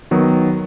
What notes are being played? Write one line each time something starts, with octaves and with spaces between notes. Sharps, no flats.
D#3 F#3 B3